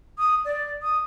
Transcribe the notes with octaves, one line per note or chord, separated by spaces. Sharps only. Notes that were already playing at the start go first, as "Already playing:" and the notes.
D#6
D5
D#6